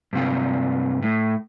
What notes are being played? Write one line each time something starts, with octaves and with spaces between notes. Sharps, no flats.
G2 C3 F4
A2